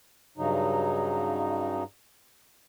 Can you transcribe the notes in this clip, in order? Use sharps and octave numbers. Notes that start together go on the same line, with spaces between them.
G2 C#3 F#3 D#4